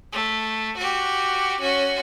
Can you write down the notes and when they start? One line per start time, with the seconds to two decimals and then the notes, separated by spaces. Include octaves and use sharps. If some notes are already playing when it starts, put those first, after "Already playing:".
0.12 A3
0.77 F#4 G4
1.60 C#4 F#4